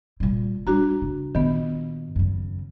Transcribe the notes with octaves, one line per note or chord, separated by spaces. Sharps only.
A#2 G3
G3 D4 F#4 A#5
C#3
A#2 D#3 B3
F#2 C#3